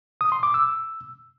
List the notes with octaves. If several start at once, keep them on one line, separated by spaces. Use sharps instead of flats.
D#6
C6
D6
E6